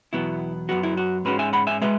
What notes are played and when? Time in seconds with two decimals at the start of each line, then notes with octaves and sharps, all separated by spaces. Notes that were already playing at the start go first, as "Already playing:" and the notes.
0.13 E2 B2 F#3 B3 E4
0.69 F#2 F#3 B3 F#4
0.83 E4
0.97 F#4
1.25 G#2 G#3 C#4 F#4 B4
1.39 E5 G#5
1.53 F#5 B5
1.67 E5 G#5
1.82 B2 G#3 B4 E5